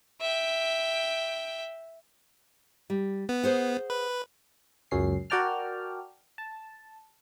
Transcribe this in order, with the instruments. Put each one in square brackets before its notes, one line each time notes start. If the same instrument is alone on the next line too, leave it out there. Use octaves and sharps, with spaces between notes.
[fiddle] E5 G5
[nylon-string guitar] G3
[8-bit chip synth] B3
[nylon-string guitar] G#4 C5 F#5
[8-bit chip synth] B4
[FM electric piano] C#2 F#2 C#4 C7
F#4 A#4 D5 G5 A5 F6
A5